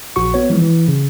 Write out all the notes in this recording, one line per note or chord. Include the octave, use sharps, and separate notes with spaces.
A#1 F#4 C#6
B3 C#5
E3 F3 G#3
E3
C#3